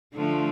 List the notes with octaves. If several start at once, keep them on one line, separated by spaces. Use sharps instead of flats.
D3 F3 A3